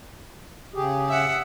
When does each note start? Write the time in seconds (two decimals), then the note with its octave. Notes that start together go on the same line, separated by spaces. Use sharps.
0.74 C#3 G4 G#4
1.09 E5 F#5